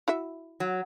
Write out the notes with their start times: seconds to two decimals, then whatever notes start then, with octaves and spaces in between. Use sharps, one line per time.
0.08 E4 F#4 E5
0.60 F#3